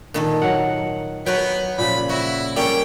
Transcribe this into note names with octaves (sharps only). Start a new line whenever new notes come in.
A#2 D#3 A4
F#3 A#4 F#5
F#3 B3 B4 C#5 G5
A#2 C#3 F3 B5
E4 F#4
G3 A#3 C#4 A4 C#5 G5